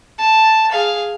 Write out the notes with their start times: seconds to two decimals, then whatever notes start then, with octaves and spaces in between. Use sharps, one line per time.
0.18 A5
0.72 G#4 F5